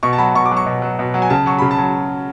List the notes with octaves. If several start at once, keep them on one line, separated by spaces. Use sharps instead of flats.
B2 C#6
A5
F#3 B5
B2 C#6
D6
F#3
C#6
B2
F#3
B2
F#3
G#5
C#3 A5
F#3 C#6
C#3 B5
A5
F#3